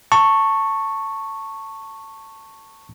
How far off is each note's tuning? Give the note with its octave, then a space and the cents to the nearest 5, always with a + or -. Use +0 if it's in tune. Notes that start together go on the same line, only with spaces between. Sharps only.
A5 +20 C#6 -5